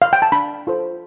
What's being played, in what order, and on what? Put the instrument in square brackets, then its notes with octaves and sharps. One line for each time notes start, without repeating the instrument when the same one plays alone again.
[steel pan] F5
G5
A5
D4 B5
F4 A4 C5